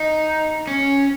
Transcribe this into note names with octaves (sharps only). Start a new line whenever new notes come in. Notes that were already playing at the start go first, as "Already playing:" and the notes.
Already playing: D#4
C#4